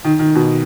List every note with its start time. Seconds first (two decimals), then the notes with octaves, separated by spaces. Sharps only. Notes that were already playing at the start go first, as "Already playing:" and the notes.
0.04 D#3
0.19 D#3
0.35 B2